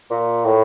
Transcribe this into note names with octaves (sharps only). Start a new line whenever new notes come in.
A#2
A2